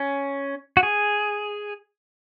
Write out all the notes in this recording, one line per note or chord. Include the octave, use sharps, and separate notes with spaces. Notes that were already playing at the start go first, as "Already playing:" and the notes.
Already playing: C#4
F#4
G#4